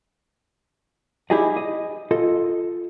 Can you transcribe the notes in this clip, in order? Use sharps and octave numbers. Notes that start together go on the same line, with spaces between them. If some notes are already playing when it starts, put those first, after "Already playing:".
D#4 E4 G4 G#4 D5 D#5
D#5
F4 A4 D#5